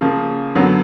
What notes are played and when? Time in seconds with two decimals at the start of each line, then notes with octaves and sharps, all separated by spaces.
0.01 C#3 F3 A#3
0.55 F#2 D3 F#3 B3